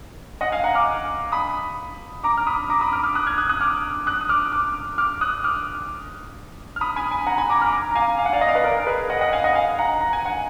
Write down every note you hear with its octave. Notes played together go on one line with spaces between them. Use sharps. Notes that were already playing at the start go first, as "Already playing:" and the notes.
D#5 F#5
F5 G#5
F#5 A#5
D6 F6
B5 D#6
A#5 D6
F6
B5 D#6
A#5 D6
B5 D#6
D6 F6
D6 F6
D#6 F#6
F6 G#6
D#6 F#6
D#6 F#6
D6 F6
D#6 F#6
D#6
D6 F6
D6 F6
D6 F6
D#6 F#6
D6 F6
F6
B5 D#6
G#5 B5
G#5 B5
F#5 A#5
G#5 B5
A#5 D6
D6 F6
A#5 D6
A#5
F5 G#5
F5
F#5
D5 F5
D#5
F5
B4 D#5
A#4 D5
A#4
G#4 B4
D#5 F#5
D#5 F#5
F5 G#5
D#5 F#5
F5 G#5
F#5 A#5
A#5
G#5
F#5